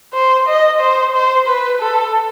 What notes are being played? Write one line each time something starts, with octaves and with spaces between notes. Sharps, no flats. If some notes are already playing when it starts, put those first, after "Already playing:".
C5
D#5
C5
C5
B4
A4